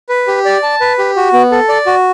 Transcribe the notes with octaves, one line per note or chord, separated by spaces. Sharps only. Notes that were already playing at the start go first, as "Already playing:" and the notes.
B4
G4
D5
A5
B4
G4
F#4
B3
A4
D5
F#4